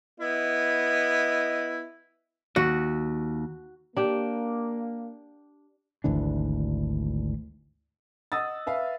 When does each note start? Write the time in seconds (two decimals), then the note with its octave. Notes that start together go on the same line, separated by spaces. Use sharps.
0.20 B3 E4 D#5
2.56 D#2 F#4
3.97 A#3 D4 G4
6.04 G#1 D2 E3 D4
8.32 D#5 F#5 D#6 E6 A6
8.67 B4 E5 F5